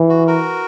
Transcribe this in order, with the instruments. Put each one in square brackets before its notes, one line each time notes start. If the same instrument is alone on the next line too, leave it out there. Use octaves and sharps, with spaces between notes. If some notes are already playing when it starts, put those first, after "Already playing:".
Already playing: [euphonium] E3
[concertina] F#4
F#4 A#4